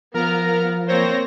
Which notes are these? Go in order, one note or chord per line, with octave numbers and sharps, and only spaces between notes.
F3 B3 A#4 A#5 F6
A#3 C4 C5 C#5 A#6